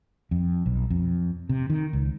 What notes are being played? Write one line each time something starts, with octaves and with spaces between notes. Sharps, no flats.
F2
B1
F2
C3
D#3
C#2